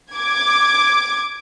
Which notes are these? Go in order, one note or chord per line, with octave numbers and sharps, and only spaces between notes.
D6 G#6